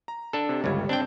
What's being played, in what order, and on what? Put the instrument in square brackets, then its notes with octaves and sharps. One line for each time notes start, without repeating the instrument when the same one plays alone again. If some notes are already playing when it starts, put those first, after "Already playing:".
[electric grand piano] A#5
[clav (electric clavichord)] D4 A4
[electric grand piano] C3
[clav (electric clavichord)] G1 C#2 [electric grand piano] G3 C#5 G#6
[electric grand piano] C4 A5 G6 [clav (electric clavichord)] D4 G5